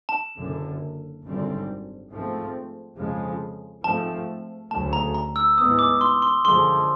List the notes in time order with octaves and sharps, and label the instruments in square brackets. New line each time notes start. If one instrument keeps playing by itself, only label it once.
[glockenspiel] A5
[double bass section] F#1 F#2 D3
G#1 F#2 D3 G3 C4
G#2 F3 A3 C4
F2 C#3 F3 G#3
[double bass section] G#2 F3 A3 C4 [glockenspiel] A5
[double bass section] D2 C#3 F#3 A3 [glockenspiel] A5
[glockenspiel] A#5
A#5
E6
[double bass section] G#2 E3 G#3 B3 [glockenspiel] D#6
[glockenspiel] D6
C6
C6
[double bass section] F#2 D3 F3 G#3 [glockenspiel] C6